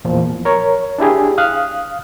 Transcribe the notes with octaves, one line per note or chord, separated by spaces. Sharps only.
E2 A#2 F3
A#4 C#5
D4 E4 G4 G#4
F5 D#6 F6 F#6